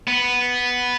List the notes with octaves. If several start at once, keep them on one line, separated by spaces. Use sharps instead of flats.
B3